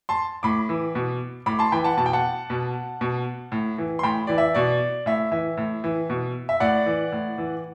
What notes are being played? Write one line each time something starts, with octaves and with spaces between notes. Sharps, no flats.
A5 C6
A2 B5 D6
E3
B2
A2 B5 D6
A5 C6
E3 G5 B5
F#5 A5
B2 A5
G5
F#5 A5
B2
B2
A2
E3
C6
A2 G5 B5
E3 D5
E5
B2 D5
A2 E5
E3 E5
A2
E3
B2
E5
A2 D5 F#5
E3
A2
E3